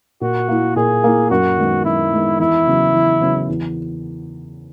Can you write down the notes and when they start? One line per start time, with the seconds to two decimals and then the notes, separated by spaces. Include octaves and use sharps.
0.21 A#2 F#4
0.48 A#3 E4
0.76 A#2 G#4
1.04 A#3 E4
1.30 F#2 F#4
1.57 D#3 G#3 B3
1.85 F#2 E4
2.13 D#3 G#3 B3
2.40 E2 E4
2.67 C#3 F#3 B3
2.94 E2
3.21 C#3 F#3 B3
3.49 E2